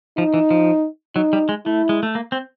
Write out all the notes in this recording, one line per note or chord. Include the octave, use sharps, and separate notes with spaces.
F3 D#4
E3
F3
F#3 D#4
G3
G#3
A3 E4
G#3
A3
A#3
C4